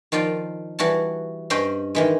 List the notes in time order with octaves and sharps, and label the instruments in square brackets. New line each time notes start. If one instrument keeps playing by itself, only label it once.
[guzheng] D#3 F3 F4 D5 G5
E3 G3 F#4 F#5 A5
G2 C#4 C5 D#5 G5 B5
D#3 E3 G#3